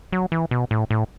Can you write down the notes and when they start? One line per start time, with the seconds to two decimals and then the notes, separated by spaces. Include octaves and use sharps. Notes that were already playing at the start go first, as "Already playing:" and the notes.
0.13 F#3
0.32 E3
0.51 B2
0.71 A2
0.91 A2